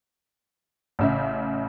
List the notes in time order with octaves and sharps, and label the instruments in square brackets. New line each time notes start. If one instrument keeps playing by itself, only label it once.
[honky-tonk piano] A1 C#3 E5